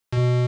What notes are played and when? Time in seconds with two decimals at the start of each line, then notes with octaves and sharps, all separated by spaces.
0.13 B2